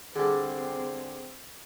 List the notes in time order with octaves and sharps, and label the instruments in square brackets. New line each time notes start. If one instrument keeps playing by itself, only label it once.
[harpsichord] G2 D3 [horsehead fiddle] C4 [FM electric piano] G#4